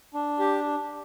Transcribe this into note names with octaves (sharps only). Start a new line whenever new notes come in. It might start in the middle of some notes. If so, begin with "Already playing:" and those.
D4
G4